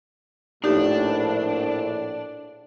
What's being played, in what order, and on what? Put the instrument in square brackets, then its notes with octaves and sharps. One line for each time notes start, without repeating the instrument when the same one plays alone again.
[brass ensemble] A#1 A2 [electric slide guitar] D4 D5 [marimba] D#4 G4 A#4